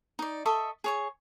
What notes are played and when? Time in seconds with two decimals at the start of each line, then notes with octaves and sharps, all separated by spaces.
0.19 D#4 D5
0.45 A4 D#5 E5 C#6
0.84 G#4 C#5 C#6